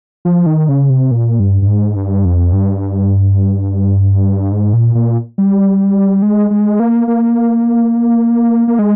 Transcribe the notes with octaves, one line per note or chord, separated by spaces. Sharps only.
F3
D#3
C#3
C3
A#2
G2
G2
G#2
G2
F2
G2
G#2
A#2
A#2
G3
G#3
G#3
A#3
A#3
A#3
G#3